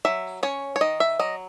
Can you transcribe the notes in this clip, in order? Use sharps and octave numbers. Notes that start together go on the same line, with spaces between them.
F#3 E5
C#4 C#5
C#5
D#3 D#5
E5
F#3 D#5